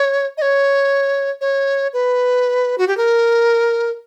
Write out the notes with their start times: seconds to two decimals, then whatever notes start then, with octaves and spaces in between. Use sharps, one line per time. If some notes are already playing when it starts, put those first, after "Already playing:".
Already playing: C#5
0.38 D#5
0.42 C#5
1.41 C#5
1.93 B4
2.78 F#4
2.88 G4
2.97 A#4